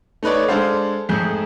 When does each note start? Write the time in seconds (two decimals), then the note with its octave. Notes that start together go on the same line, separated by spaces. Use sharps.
0.23 A3 D#4 B4 C#5 D5
0.48 G#3 D4 A4 C5 F5
1.09 F2 G#2 A3 G#4 G6